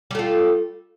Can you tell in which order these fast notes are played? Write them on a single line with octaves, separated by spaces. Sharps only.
G3 A3 F4